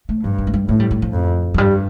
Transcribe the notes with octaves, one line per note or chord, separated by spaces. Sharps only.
A3
G2 F3
D#3
A3
G3
A2 A3
G3
G3
F3
F2
F3
G2 G3